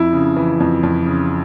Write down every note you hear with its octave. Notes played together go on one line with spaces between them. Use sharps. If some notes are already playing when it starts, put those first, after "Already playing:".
Already playing: F2 E4
C#3
E3
F2
F2
C#3